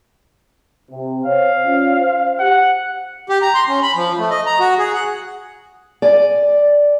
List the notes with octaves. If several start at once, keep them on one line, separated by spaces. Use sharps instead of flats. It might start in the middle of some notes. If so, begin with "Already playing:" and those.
C3
C5 C#5 F5
C#4 F4 D5
C5
G4 F#5
G4
A#5
C6
C#4
B5
F3
A3
D#5
A#5
F#4
G#4
F#5
D5 G#5